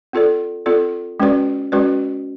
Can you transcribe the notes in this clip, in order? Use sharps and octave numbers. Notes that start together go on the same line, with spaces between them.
C4 F4 A4 D5
C4 F4 A4 D5
G#3 C#4 F#4 B4 D5
G#3 C#4 F#4 B4 D5